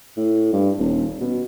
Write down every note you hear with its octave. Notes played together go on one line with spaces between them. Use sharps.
A2
G2
D#1
B2